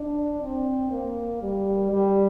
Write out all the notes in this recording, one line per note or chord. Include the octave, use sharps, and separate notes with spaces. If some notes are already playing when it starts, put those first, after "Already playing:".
Already playing: D4
C4
A#3
G3
G3